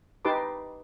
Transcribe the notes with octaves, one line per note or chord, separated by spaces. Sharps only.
D#4 G4 B4 A5 C6 D6